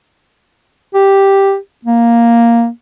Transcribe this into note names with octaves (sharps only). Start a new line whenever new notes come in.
G4
A#3